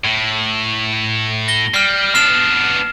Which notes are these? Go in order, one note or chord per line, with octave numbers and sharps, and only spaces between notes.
A2
A#6 G7
G3 F6 C7
B3 D4 F6 C7 E7